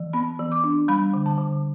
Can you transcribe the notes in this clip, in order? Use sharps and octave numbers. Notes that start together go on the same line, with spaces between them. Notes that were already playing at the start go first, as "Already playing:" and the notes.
Already playing: E3
B3 B5
E3
D6
D4
G3 B5
D3
A5
D3